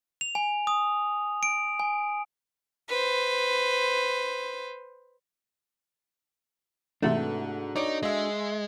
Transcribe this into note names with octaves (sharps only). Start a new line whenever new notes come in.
F7
G#5
D#6
D7
G#5
B4 C5
G#2 C3 E3 A3 D4 F#4 A4
D#4 C#5 D5 D7
G#3 D#5 E5